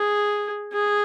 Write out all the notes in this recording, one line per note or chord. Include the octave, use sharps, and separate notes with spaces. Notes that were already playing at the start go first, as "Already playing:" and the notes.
Already playing: G#4
G#4